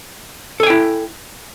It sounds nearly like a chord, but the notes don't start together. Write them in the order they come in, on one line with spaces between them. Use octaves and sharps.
A4 G#5 G5 E4